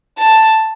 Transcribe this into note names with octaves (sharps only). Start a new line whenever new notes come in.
A5